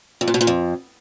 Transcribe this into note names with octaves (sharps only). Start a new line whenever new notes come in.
F2
A#2
B2
A#2
F2